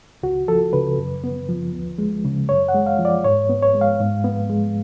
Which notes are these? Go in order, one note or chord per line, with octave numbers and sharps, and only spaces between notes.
C#2 F#4
F3 A4
C#3 B4
F#2
B3
F3
D2
G#3
C#3
F#2 C#5
F#5
G#3
F5
F3
D5
G#2 C#5
B3
C#5
G#3
F5
G#2
B3
G#3